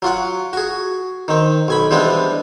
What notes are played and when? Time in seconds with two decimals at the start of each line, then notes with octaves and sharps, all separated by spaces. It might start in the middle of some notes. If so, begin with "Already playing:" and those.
0.02 F#3 F4 F#5
0.53 F#4 G#4
1.28 D#3 C4
1.68 B1 G#5 B5
1.91 E3 G3 G#3 B3 C4 D4